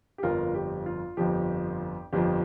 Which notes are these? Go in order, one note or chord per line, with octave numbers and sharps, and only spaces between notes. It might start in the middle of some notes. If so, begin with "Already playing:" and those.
G4
G1 F2 F3 F4 A#4
G4
F4
G1 F2 F3 G4
G1 F2 F3 G4